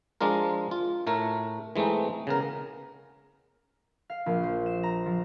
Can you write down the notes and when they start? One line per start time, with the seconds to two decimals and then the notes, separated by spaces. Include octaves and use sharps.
0.21 F3 G#3 D4 F4 A#4
0.71 F4
1.07 A2 A3 A#4
1.76 E3 G#3 A3 C4 D#4
2.27 C#3 B3 A#4
4.10 F5
4.26 A#1
4.43 C5
4.66 E7
4.83 A#5
5.06 F3